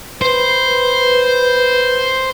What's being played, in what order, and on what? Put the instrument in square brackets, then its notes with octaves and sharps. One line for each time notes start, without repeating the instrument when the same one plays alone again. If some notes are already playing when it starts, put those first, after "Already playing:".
[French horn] B4 [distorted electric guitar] C5